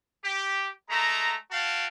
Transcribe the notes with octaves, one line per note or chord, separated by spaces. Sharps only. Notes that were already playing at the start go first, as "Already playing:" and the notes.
G4
G#3 A3 A#5
F#4 F5 G5 A5